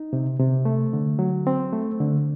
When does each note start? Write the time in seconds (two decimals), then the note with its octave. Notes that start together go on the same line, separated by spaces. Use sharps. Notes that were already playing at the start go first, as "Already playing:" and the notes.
Already playing: D#4
0.13 C3
0.39 C3
0.65 A3
0.93 D3
1.19 F#3
1.47 C4
1.73 A3
2.00 D3